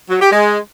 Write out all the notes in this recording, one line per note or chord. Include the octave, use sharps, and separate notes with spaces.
F#3
G4
G#3